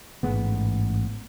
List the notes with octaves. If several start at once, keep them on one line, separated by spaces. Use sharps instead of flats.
A1 G#2 G#3 B3